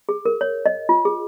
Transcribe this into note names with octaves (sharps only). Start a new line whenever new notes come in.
G#4
A#4
C#5
D#5
F4
G#4